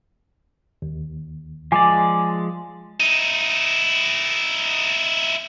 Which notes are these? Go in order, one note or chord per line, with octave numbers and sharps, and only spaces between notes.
D#2
F3 G#3 D5 G#5 D6
D#4 E4